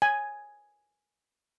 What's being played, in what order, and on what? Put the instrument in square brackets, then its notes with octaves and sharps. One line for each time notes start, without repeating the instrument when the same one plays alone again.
[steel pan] G#5